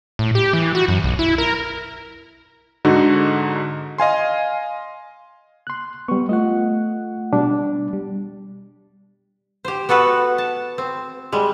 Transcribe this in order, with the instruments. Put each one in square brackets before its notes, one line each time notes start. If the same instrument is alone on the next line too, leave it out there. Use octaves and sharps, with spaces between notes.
[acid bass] A2
G4
E3
F#4
F#2
B1
E4
A#4
[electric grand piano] G#2 D3 D#4 F#4
D#5 F5 G#5 C6
[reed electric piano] C6 F#6
[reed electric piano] G3 C#6 [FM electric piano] B3
[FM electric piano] A3 F4 F#5 [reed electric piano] D#5
[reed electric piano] B2 G3 D4
[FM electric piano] G3
[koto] G4 C5
B3 F#4 A4 B4
A5
C4
G3 G#3